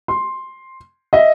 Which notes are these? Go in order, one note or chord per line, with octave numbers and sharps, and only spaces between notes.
C6
D#5 E5